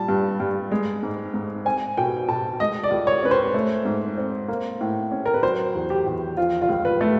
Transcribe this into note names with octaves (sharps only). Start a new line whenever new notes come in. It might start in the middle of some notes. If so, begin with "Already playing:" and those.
Already playing: A#2 G3 A5
G2
G2
G#3
G#2
G#2
C4 G#5
B2 G5
B2 A5
G#3 D#5
D5
C#2
C#5
C#4 B4
C5
A3
G#2
C4
A#3
A2
C#4
A#4
B4
F#3 C5
E2
G4
E2
F3 F4
F4
C#2
B4
A3